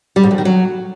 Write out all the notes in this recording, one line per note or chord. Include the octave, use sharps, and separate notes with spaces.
G3
G#2
F2
D#3
F#3